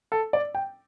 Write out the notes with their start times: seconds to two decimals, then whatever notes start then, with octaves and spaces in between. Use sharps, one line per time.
0.12 A4
0.33 D5
0.55 G5